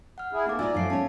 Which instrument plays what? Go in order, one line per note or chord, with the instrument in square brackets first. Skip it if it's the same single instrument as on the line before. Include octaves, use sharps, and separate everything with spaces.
[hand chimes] F#5 F6
[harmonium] E4 G#4
[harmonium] A3 A#3 [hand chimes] C4 D#4 D6
[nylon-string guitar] E4 F4 A#4 [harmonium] D5 [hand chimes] G#5 E6 A6
[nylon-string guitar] F#2 F3 [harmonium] A3 [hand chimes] F5 C7 D7
[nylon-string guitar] C#4 C#5 [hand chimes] A5